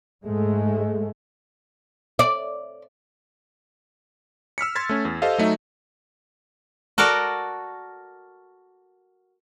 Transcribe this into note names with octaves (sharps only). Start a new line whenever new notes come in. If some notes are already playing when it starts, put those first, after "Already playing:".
G#2 G#3 A3
D5
E6 F6 B6 C#7
C6 F6 G#6 A6 B6
A3 C#4
E2
G4 A4 C5 D#5 F5
F#3 A3 D#4 E5
F#4 A4 A#4 D5 F#5